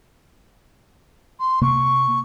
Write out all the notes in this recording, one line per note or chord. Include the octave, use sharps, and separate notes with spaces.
C6
C3 A#3 C#6